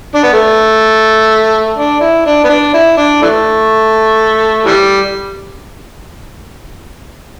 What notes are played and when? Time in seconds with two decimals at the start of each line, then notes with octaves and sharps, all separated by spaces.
0.15 D4
0.24 B3
0.33 A3
1.78 D4
2.01 E4
2.26 D4
2.44 B3
2.49 D4
2.74 E4
2.97 D4
3.22 E3 A3
4.66 E3 G3